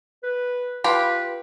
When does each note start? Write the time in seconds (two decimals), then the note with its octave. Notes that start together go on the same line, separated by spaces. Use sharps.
0.23 B4
0.84 F4 G4 B4 B5